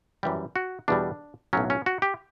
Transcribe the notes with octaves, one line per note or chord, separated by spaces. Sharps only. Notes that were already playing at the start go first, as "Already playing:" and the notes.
F#2 E3 G3 G4
F#4
E2 B2 G3 D4
B1 A2 F#3 C#4
C#4
F#4
G4